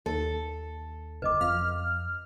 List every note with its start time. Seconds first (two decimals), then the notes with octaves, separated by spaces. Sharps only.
0.06 D#2 A4
1.22 F#1 B4 D#5 D6
1.41 F2 F5 F6